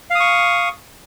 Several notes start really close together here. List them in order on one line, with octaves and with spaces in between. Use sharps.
F5 D#6 C#6